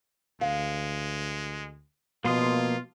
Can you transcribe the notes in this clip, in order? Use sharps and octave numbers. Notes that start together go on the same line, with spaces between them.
D2 G#3 F5
B2 F3 A#3 F4 C6 D#6